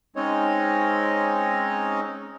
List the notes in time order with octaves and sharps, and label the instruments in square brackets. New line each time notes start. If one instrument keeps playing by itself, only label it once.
[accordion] G#3 C4 C#4 D#4 C#5 D#5